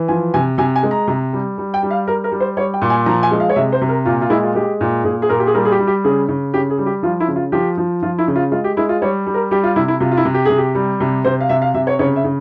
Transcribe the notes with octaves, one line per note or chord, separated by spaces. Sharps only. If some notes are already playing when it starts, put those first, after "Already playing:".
Already playing: E3
F3 G#5
C3 G#5
C3 G#5
G#5
G#3
A#5
C3
G3
G3
G5
G3
F5
G3 A#4
A#4
G3
C5
G3 C#5
G5
A#2
G#5
F3 A#5
G#5
G#3
F5
C#5
C3 E5
C5
C3
A#4
A#2 F4
F4
G#3 E4
F4
G#3 G4
A#2
A#2 G#4
G#4
A#2 A#4
G4
G#4
G3 A#4
G#4
G4
G3
G4
C#3 G#4
C#3
C#3 G4
G#4
G3
G4
F3 F4
E4
C#3
F4
F3 G4
F3
F3 F4
E4
C#3
F4
G#3 F4
G4
G#3 E4
F4
G3 C#5
G3
A#4
G3 G4
F4
C3 E4
E4
C3 F4
F4
E4
C3
G4
C3 G#4
G4
G3
C3
C3 C5
F5
C3 E5
F5
C3 E5
C#5
C#3 C#5
E5
C#3